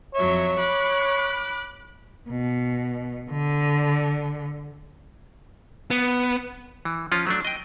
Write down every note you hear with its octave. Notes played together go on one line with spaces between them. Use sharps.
F2 F#3 C#5 E5
B5 D6 F#6
B2
D3
B3
E3
F3 C#4 F4
F#3 A3 D4
D#5 G5